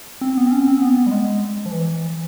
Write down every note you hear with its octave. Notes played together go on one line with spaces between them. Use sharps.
C4
B3
C4
C#4
C4
B3
B3
G3
G#3
F3
E3
E3